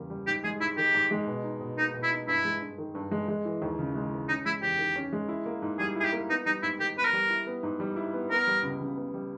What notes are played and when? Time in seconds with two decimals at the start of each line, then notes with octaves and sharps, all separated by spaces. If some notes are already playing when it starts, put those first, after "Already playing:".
Already playing: E2 C#3 G3 A#3
0.10 G3
0.27 G#2 G4
0.44 G#3 G#4
0.60 G#2 E4
0.77 D#3 G4
0.94 G#2
1.11 G#3
1.27 B2
1.44 D#4
1.61 B2
1.77 A#3 D#4
1.94 B2
2.03 E4
2.11 D#4
2.28 G2 E4
2.45 G#3
2.61 G2
2.78 D#3
2.95 G2
3.11 G#3
3.28 G#3
3.45 E3
3.62 D#2
3.79 C#3
3.95 G#3
4.11 E3
4.28 C#4 D#4
4.46 G#3 E4
4.62 E2 G4
4.78 D#3
4.95 C#4
5.13 G#3
5.29 E4
5.46 A#3
5.62 G#2
5.79 G3 G#4
5.96 E4 G#4
6.04 G4
6.12 A#3
6.29 B3 D#4
6.46 G3 D#4
6.62 G#2 E4
6.79 D#3 G4
6.96 B3 B4
7.05 A#4
7.13 G3
7.30 E4
7.47 B3
7.63 G#2
7.80 G3
7.96 E4
8.14 B3
8.30 B3 A#4
8.47 G3
8.63 C#2
8.80 C#3
8.97 B3
9.14 G3